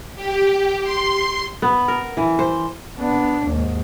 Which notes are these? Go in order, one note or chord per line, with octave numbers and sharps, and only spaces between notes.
G4
C6
B3
A#4
E3
C5
B3 D4
D#2 G#2